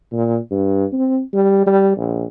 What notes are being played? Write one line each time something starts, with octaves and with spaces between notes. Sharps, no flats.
A#2
G2
C4
G3
G3
A#1